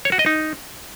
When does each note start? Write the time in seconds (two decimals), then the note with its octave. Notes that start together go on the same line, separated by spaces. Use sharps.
0.05 C#5
0.12 F#4
0.19 D#5
0.26 D#4